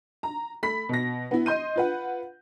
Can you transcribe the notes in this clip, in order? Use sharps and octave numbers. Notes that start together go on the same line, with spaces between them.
A#5
A3 B5 B6
B2 A#6
B3 E4
D#5 C6 G6 D#7
F4 B4 F#5